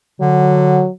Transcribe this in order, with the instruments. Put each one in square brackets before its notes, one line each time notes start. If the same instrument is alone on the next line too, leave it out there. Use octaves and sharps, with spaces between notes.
[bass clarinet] D3 [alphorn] F#3